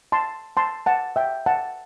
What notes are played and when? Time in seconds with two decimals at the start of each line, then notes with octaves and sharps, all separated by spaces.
0.12 A5 C6
0.57 A5 C6
0.86 F#5 A5
1.16 E5 G5
1.46 F#5 A5